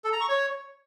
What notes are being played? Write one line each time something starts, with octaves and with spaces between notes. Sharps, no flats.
A4
A#5
C#6
C#5